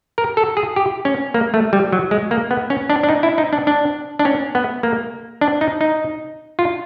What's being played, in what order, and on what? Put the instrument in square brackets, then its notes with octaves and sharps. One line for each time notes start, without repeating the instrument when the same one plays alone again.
[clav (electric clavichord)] A#4
A4
G#4
G4
C#4
A#3
A3
G3
F#3
G#3
A#3
B3
C#4
D4
D4
D#4
E4
D#4
D4
D4
D4
C#4
B3
A#3
D4
D#4
D#4
F4